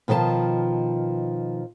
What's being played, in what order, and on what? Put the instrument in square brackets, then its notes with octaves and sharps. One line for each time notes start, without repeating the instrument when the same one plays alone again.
[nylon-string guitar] B2 D#3 F3 A#4 A5